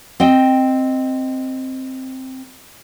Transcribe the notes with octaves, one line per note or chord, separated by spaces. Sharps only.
C4 D#5 G5